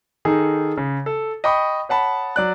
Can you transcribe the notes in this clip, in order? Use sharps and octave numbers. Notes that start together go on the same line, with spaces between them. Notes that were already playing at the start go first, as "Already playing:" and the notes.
D#3 D#4 G#4 A4
C#3
A4
D#5 G5 B5 C#6 D#6
C#5 F#5 A5 B5
F#3 D5 F#6